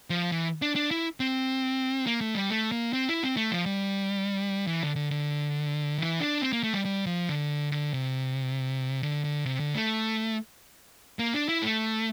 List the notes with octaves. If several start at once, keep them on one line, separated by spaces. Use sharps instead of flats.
F3
E3
D4
D4
E4
C4
A#3
A3
G3
A3
A#3
C4
E4
C4
A3
F3
G3
E3
D3
D3
D3
E3
D4
C4
A#3
A3
G3
G3
F3
D3
D3
C3
D3
D3
C3
D3
A3
A#3
D4
E4
A3